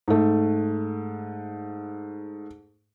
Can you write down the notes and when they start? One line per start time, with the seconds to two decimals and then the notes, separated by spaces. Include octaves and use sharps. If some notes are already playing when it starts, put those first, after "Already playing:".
0.08 G#2 A3